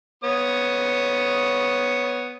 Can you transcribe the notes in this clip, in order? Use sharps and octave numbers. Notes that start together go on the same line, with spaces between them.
B3 C#5 D#6